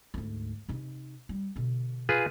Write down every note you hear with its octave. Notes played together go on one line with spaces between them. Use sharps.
D2 G#2
C3 D#4
G3
B2 D3
F4 G#4 B4